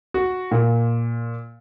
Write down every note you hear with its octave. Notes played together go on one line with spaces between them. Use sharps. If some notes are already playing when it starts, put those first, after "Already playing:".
F#4
A#2